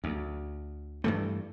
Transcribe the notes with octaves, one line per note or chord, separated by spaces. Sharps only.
D2
G2 E3 A3